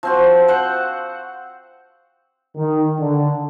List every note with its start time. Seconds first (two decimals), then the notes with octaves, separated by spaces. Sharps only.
0.03 F3 C4 F#4
0.48 C5 F#5
2.56 D#3
2.99 D3